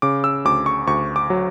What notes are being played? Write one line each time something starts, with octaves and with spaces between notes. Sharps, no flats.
C#3 D6
E6
D2 D6
C#6
D2 C#6
D6
F#3